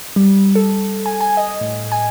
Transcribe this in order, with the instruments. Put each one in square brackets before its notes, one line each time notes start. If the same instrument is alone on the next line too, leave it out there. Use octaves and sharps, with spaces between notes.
[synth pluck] G3
A4
G#5
G#5
D#5
A2
G#5